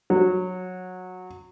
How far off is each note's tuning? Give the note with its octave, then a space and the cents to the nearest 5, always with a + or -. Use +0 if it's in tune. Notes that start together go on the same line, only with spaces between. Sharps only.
F#3 -15